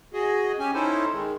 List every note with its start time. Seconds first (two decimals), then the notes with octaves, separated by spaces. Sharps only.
0.13 F#4 G#4 D#5
0.59 C#4 G4 G#5
0.74 C#4 D#4 E4 A4 C5
1.12 D#3 G#3